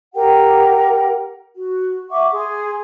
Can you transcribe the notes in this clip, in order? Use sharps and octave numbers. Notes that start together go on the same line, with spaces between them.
G4 A#4 F#5 G5
F#4
E5 F#5 C#6 D6
G#4 C6 D#6